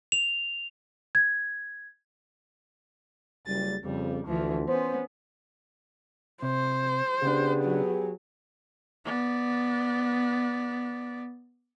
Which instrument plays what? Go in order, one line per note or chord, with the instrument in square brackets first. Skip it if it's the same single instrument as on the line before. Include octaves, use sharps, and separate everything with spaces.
[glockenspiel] F7
[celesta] G#6
[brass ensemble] F#1 G3 [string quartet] A6
[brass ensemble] F2 C#3 [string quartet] G3
[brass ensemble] D2 [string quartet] E3 F3
[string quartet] B3 C#4 [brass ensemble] C5
[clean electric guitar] C3 [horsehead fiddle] C5
[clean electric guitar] C#3 D4 [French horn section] B3 G4 G#4
[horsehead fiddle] F#3
B3 D5